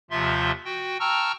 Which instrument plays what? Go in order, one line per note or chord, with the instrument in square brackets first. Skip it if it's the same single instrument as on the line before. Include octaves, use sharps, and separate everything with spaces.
[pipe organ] D#2 C3 F3 F4 E5 C6
F#4 G5
G5 A5 A#5 C#6 E6 F6